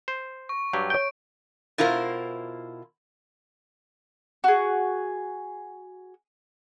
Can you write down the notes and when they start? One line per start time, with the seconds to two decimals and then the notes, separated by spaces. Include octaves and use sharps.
0.08 C5
0.49 C#6
0.73 G2 F#3 G4
0.90 C#5 G6 D7
1.78 B2 E4 F4 A#4 C5
4.44 F#4 G#4